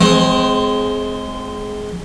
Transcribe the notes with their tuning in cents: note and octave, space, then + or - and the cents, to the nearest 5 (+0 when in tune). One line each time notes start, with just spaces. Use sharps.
G#3 +15 C4 -25 C5 +35